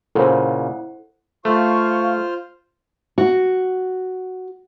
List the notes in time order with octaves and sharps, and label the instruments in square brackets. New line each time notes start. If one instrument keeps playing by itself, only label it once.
[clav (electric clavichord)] A#2 C#3 [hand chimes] E4 F#5 [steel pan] A4 C5
[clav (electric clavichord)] A3 [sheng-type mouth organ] F4 C5 F6 [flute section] F5 C#6
[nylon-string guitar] F#4